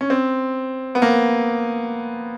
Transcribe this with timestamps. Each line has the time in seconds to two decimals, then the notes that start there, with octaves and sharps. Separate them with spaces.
0.01 C#4
0.10 C4
0.95 B3
1.02 A#3